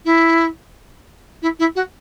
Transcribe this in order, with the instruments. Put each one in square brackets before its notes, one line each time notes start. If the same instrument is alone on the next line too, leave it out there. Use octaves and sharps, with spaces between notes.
[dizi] E4
E4
E4
F#4